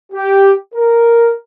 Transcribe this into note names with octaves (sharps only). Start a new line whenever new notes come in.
G4
A#4